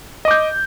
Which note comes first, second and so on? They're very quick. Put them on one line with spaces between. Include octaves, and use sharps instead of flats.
D#5 D6 G6